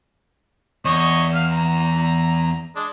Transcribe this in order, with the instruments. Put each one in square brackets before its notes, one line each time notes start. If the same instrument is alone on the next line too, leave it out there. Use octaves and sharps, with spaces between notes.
[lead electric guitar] E2 [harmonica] C#5 D#5 C#6
[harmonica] F5
A#5
G#3 D4